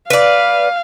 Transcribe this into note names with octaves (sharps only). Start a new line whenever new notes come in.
B4 D5 F5